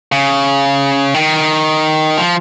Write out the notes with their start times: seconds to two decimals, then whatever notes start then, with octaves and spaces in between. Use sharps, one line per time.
0.12 C#3
1.14 D#3
2.18 F3